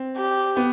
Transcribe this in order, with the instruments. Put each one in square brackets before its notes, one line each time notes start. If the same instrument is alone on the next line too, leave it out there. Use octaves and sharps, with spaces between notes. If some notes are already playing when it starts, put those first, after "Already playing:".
Already playing: [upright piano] C4
[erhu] G4
[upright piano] B3